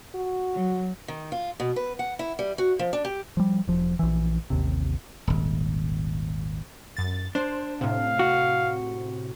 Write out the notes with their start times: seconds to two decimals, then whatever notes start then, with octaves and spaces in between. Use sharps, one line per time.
0.15 F#4
0.54 F#3
1.08 D#3
1.32 F4
1.60 B2
1.76 B4
1.99 F#5
2.19 E4
2.39 G3
2.58 F#4
2.79 F3
2.93 D4
3.05 G4
3.37 F3 G3
3.67 E1 F3
3.99 A#1 E3
4.50 A1 D#2 C3
5.27 D#1 G#1
6.97 F#2 A6
7.35 D4 C5
7.81 A2 C3 F5
8.19 F#4